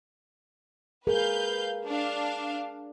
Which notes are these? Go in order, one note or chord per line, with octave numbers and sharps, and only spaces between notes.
G#4 A#4 B4 F5 G6
D4 F5